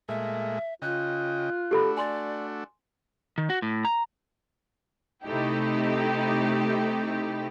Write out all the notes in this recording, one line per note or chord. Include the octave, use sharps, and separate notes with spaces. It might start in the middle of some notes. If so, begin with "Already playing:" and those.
A#2 G#3 A3 E5
C#3 F4 D#5 G5 F#6
A3 D4 F#4 G4 A4 B5
D5 G#5 C6
D#3
F#4
A2
A#5
C3 A3 D#4 E4 G4